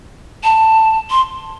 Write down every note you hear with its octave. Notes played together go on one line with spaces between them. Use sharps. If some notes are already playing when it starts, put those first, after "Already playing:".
A5
C6